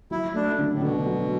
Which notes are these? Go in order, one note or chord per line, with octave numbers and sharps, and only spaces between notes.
F#3 E4
A3 D4
D3
A2
B2 D3
F#3